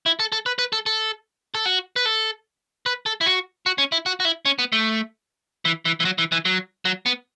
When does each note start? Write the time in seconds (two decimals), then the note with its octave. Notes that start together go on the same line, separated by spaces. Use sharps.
0.06 E4
0.20 A4
0.32 A4
0.46 B4
0.59 B4
0.73 A4
0.86 A4
1.55 A4
1.66 F#4
1.96 B4
2.06 A4
2.86 B4
3.06 A4
3.21 E4
3.26 F#4
3.66 F#4
3.78 C#4
3.92 E4
4.06 F#4
4.20 F#4
4.25 E4
4.45 C#4
4.59 B3
4.72 A3
5.65 E3
5.85 E3
6.00 E3
6.05 F#3
6.18 E3
6.32 E3
6.45 F#3
6.85 F#3
7.06 B3